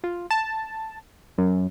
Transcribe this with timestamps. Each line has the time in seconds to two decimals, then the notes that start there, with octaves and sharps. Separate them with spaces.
0.04 F4
0.31 A5
1.38 F#2